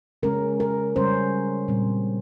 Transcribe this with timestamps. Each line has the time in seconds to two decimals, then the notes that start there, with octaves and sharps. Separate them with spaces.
0.23 C#3 G#3 C#4 A#4
0.60 A#4
0.95 C#3 G3 C#4 C5
1.68 A#2 G3 C4